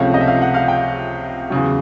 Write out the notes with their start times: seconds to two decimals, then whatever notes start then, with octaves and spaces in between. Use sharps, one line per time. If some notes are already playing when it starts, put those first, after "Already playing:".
Already playing: C#2 C3 F3 A3 C#4 F5
0.14 D#5
0.21 E5
0.27 F5
0.41 F#5
0.54 F5
0.68 G5
1.50 E2 C#3 F#3